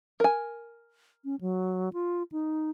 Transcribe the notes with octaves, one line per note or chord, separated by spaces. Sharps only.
A#4 G#5
C#4
F#3
F4
D#4